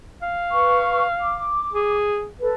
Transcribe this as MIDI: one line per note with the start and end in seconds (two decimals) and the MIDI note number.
0.22 1.56 77
0.52 1.04 71
0.52 1.04 85
1.20 1.95 86
1.74 2.28 68
2.40 2.55 69
2.40 2.55 71